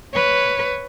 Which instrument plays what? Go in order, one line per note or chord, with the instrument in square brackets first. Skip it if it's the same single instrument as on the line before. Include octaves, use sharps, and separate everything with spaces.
[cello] B4 C#5